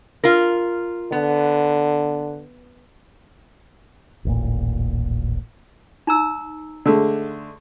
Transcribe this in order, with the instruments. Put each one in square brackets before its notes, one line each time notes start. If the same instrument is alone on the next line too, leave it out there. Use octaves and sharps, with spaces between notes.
[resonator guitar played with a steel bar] F4 A#4
[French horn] D3 [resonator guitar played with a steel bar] B3
[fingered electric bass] D#1 A1 A#2
[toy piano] D#4 A#5 E6
[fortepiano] D3 G#3 A3